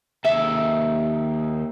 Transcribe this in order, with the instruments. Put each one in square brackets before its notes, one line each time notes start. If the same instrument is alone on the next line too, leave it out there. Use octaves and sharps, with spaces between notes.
[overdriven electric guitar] D#2 A4 [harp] E5